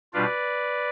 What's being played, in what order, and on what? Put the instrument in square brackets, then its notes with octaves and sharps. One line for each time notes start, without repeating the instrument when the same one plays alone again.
[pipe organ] B2 G3 D4 F4 B4 D5